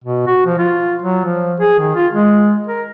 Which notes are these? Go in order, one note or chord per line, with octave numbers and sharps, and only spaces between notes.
B2
F#4
F3
F4
F#3
F3
G#4
D#3
F4
G#3
A#4